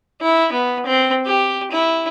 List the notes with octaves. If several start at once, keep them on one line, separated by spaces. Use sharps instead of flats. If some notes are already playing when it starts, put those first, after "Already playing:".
E4
B3
C4
G4
E4